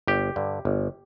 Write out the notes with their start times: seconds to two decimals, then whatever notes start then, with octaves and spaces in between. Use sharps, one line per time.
0.07 G1 G4
0.36 G2 D3
0.65 G1